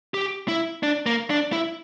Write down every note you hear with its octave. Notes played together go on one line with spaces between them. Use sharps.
G4
E4
D4
A#3
D4
E4